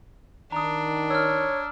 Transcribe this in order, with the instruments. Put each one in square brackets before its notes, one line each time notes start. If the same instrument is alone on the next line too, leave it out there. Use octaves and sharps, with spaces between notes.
[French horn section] D#3 [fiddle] D4 [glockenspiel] A#5 D#6
[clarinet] C#5 [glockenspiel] E6 F6